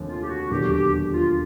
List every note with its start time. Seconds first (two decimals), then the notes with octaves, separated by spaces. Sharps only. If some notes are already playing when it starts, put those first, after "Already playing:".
Already playing: F1 D#2 D3 F3
0.08 F4
0.23 G4
0.29 F#4
0.50 E1 D#2 D3 F#3 G4
0.72 G4
1.14 F4